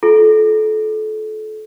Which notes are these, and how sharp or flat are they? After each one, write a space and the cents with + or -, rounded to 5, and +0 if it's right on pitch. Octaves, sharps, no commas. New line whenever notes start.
F4 +0 A4 -30